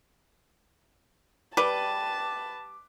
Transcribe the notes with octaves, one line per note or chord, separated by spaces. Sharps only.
G3 B4 A5 D6